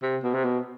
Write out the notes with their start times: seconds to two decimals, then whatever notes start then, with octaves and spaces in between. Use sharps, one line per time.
0.02 C3
0.23 B2
0.34 C3
0.44 B2